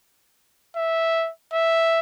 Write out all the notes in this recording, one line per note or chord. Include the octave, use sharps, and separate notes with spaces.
E5
E5